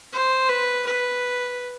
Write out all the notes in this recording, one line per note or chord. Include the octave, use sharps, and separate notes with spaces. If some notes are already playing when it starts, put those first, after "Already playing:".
C5
B4
B4